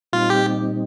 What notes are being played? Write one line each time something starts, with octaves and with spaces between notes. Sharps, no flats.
A#2 G3 C4 D#4 F4
G4